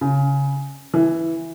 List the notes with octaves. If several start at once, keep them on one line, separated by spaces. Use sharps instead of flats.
C#3
E3